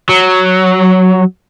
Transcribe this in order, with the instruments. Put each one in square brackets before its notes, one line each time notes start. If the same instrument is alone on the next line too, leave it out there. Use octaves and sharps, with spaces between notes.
[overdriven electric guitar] F#3